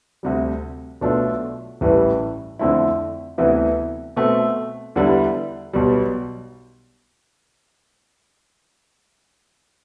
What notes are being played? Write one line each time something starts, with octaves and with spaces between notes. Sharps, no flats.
D2 C3 G3
B1 B2 A3 D4 F4
A1 A2 E3 G3
F2 D3 A3 C4 E4
D2 C3 E3 B3 E4
B2 A3 C4
E2 D3 G3 B3 E4
B1 B2 G3